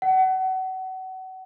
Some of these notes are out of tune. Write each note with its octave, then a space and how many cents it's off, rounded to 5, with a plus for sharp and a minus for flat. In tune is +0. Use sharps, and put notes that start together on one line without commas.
F#5 +30